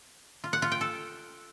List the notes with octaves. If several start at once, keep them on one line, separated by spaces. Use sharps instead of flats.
F4
F#5
F4
G5
A4